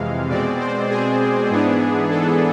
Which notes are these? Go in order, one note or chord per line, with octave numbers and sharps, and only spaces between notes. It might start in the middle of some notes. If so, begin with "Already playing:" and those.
Already playing: F2 C3 E3 G#3 F5
B2 G#3 C4 D5
C5
G#4
G#2 E3 B3 D4
A4